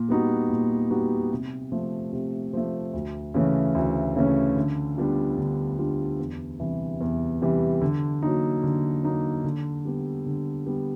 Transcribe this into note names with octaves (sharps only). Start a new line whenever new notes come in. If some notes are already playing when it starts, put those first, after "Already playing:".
Already playing: A#2
G3 B3 D#4 F#4
A#2
G3 B3 D#4 F#4
C3
F3 A3
C3
F3 A3
D2
C#3 E3 A3 C#4
D2
C#3 E3 A3 C#4
D3
G3 B3 D4 F4
D3
G3 B3 D4 F4
E2
C3 E3 G3
E2
C3 E3 G3
D3
F#3 A#3 D#4
D3
F#3 A#3 D#4
D3
G3 B3
D3
G3 B3